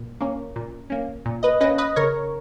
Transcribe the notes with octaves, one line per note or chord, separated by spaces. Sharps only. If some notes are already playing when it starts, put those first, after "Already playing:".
Already playing: A#2
A#3 C#4
A#2
A#3 C#4
A#2
B4 D#5
A#3 C#4 B4 D#5
B4 D#5
C#3 A#4 C#5